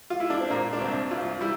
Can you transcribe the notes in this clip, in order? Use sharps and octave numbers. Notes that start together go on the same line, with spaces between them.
F4
E4
D4
C4
A#2 A#3
D4
C2 C4
C2 F4
G3 E4